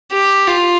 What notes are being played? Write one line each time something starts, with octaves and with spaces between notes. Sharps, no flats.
G4
F4